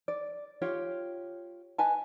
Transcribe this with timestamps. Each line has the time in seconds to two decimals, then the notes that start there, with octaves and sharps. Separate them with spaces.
0.08 D5
0.62 F4 G4 C#5 G5
1.78 B4 D#5 G#5 A5